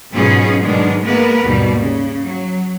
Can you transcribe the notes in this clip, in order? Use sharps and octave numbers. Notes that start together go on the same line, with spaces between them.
G#2 B2 F#3 C#4 F4 G#4
G#2 B2 D#3 F#3 G#3 D4
G#3 A#3 B3 A#4 B4
D#2 G#2 B2 G3
C#3
F#3